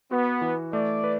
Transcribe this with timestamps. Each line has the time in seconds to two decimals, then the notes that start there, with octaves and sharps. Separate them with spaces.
0.11 B3 F#4
0.41 E3
0.73 A3 D5
1.04 B4